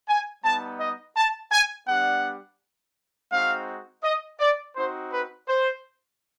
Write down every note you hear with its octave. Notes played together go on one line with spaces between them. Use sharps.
G#5
G3 B3 D#4 A5
D#5
A5
G#5
G3 B3 D4 G4 F#5
G#3 C4 D#4 F#4 F5
D#5
D5
C4 D#4 F#4 C5
B4
C5